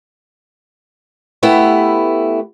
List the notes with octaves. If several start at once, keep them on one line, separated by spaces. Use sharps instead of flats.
A3 B3 E4 G4